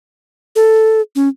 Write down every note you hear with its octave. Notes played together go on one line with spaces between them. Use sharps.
A4
C#4